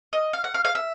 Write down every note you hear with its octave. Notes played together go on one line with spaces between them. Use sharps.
D#5
F5
F#5
F5
F5
E5